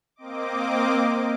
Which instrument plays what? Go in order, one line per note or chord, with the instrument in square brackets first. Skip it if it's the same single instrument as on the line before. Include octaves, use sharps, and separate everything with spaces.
[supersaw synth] A#3 C4 D#5 D6